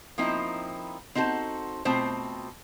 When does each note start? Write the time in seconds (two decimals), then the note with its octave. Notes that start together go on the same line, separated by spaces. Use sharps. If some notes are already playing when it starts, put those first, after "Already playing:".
0.18 F3 A#3 C4 D#4 E4
1.15 C4 D#4 F#4 A4 A#4 C5
1.85 B2 A3 C4 F4 C5